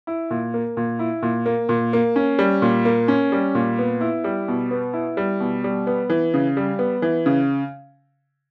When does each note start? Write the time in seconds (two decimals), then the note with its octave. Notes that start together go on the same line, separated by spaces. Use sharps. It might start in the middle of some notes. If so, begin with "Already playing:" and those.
0.07 E4
0.31 A#2
0.54 A#3
0.77 A#2
0.99 E4
1.23 A#2
1.46 A#3
1.69 A#2
1.93 A#3
2.16 C#4
2.39 G3
2.62 A#2
2.85 A#3
3.08 C#4
3.32 G3
3.55 A#2
3.79 B3
4.01 E4
4.24 G3
4.48 B2
4.71 B3
4.93 E4
5.17 G3
5.40 B2
5.64 G3
5.87 B3
6.10 E3
6.34 C#3
6.57 G3
6.79 B3
7.02 E3
7.26 C#3